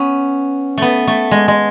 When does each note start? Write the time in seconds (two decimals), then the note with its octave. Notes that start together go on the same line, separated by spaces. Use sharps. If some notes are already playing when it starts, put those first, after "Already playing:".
Already playing: B3 C#4
0.77 A3 B3
1.07 A3
1.31 G#3
1.48 G#3